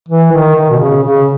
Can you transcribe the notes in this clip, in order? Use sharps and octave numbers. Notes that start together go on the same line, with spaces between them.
E3
D#3
D#3
B2
C#3
C#3